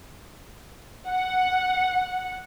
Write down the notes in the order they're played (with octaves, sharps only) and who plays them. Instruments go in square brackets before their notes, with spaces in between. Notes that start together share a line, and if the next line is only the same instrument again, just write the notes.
[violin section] F#5